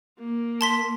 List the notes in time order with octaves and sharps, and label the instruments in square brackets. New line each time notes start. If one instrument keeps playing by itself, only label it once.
[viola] A#3
[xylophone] A5 C6 B6